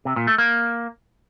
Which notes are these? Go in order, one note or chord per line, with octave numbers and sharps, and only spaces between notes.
C3
A#2
A3
A#3